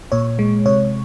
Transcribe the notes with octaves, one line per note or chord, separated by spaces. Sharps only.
A#2 C#5
G#3
C3 C#5